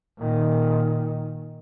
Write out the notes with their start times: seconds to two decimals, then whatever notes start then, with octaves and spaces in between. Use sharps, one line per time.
0.18 A#2 D#3